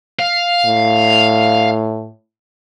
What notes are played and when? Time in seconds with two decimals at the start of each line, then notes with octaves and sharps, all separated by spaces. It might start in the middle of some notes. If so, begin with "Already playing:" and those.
0.19 F5
0.65 A2